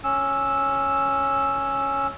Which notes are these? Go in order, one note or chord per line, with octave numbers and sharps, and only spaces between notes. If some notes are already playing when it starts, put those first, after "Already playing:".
C#4 E6